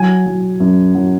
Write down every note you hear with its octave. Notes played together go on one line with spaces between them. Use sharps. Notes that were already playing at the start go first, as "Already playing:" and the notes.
Already playing: F#3 G#5
F#3
F#2
F#3